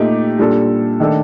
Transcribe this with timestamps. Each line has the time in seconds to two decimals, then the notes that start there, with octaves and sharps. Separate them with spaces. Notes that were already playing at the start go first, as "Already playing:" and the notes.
Already playing: A#2 A3 D#4 G4
0.39 A#2 G3 D4 A4
1.00 D#3 A3 D4 A4